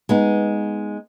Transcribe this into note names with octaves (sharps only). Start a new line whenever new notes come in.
G#3 B3 D#4